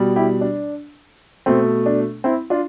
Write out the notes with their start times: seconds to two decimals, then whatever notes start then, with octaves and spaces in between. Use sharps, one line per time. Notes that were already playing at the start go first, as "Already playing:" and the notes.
Already playing: B2 G3
0.16 E4 G4
0.41 D4
1.46 B2 A3 C4
1.86 D4
2.24 C4 E4
2.50 D4 F4